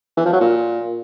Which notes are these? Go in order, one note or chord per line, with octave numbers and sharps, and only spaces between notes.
E3
F3
F#3
A#2